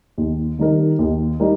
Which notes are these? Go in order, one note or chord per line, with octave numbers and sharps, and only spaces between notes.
D#2
D#3 G3 D#4 A#4
D#2
G3 D#4 A#4